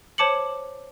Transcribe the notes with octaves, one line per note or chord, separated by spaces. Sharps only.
C5 C#5 A5 D6 C#7 F#7